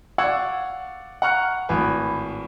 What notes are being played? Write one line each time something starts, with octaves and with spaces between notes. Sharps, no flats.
D5 F5 F#5 C#6 E6 G#6
F#5 A#5 C#6 F6 F#6 C#7
G#1 A2 B4 G#5